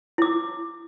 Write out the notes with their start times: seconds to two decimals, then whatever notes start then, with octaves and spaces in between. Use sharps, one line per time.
0.18 E4 D6